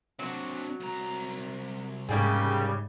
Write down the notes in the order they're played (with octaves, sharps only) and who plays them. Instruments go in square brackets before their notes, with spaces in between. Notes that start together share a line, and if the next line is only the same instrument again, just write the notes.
[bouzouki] F#3 [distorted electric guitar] C4 D4
[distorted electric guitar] C2 A#5
[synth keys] G#2 [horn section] C#3 G3 [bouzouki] A#3 G4 G#4